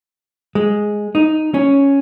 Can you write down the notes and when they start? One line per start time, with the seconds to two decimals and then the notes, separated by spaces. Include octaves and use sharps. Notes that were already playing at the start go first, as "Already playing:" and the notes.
0.55 G#3
1.15 D#4
1.54 C#4